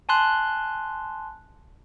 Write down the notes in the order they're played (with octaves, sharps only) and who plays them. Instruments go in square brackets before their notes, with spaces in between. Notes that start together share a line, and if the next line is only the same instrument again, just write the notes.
[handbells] G#5 A5 C6 F#6